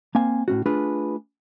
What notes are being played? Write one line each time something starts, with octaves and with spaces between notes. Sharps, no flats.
A#3 C4 F5 G#5
A2 C#4 F#4
A3 D4 F4 G#4 B4